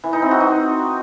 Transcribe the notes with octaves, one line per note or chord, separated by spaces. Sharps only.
E3
D#4
C4
F#4
D#4